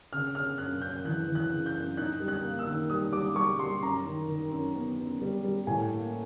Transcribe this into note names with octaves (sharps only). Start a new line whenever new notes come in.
C#3 F6
C#3 F6
F#2 F#6
F#2 G6
E3 F#6
E3
F#6
C#3
G6
F#2
D#4 F#6
G3
F#6
A#3
E6
D#3
G3 D#6
G3 D6
G3 C#6
G3 C6
F#2 A#5
D#3
D#3
F#2
B3
F#2
G3
G3
A2 G#5
A#3